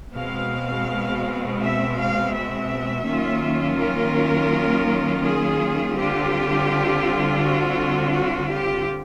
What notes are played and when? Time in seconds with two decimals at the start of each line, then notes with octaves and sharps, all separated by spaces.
0.15 B2 G#3 C4 F5
1.60 E5
1.97 F5
2.32 E5
3.05 D#3 F#3 A#3 C#4 F4
3.78 A#4
5.23 G#4
5.95 D3 G3 C4 F4 G4
7.40 F#4
8.13 F#4
8.49 G4